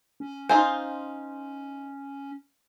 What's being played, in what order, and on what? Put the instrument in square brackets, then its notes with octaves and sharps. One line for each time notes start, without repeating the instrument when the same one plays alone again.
[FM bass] C#4
[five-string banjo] D#4 F4 C5 [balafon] G#5